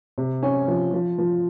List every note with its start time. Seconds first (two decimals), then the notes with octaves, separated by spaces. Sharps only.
0.18 C3
0.43 C#4
0.68 F3
0.93 F3
1.18 F3